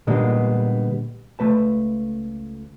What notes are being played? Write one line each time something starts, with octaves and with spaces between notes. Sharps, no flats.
A#2 D3 G3 G#3 A#3 B3
C#2 A3 B4 A5